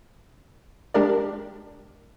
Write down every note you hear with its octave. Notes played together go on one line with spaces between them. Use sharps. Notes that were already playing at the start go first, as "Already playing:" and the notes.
G#3 D4 G4 A#4 D5